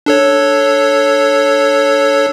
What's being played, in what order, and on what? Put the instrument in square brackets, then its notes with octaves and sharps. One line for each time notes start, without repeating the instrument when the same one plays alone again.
[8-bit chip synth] D4 A4 C#5